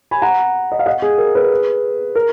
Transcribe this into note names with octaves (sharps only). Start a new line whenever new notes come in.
G#5 B5
F#5 A#5
D#5
F5
D#5 F#5
G#4
A#4
G#4 B4
A#4